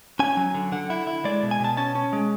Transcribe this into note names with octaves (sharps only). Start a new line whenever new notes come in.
C#4 G#5
F#3
D3
D3 F#5
E4
E4
G#3 D5
B2
G#5
B2 A5
C#4 A5
C#4
G#3